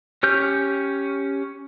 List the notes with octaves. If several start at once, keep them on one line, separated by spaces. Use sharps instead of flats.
C#4 G4 F6 G6